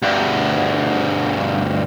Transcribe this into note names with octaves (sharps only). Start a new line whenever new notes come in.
D2 G2